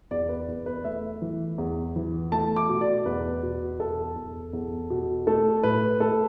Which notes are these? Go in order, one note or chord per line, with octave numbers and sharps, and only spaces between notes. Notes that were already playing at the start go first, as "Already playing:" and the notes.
E2 D5
B4
E2
B4
A3 E5
E3
E2
E3
A3 A5
D6
B2
D5
E2 B4
B2
E2 A4
E2
E2
B2
A3 A4
A2 B4
A3 A4